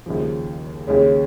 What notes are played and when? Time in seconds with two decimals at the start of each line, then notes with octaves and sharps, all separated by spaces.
0.06 D#2 C#3 F3
0.87 D#2 C#3 G#3 C#4